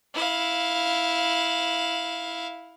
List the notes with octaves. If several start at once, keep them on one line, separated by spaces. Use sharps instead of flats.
E4 F5